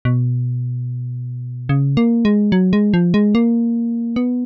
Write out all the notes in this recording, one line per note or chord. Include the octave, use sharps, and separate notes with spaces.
B2
C#3
A#3
G#3
F#3
G#3
F3
G#3
A#3
B3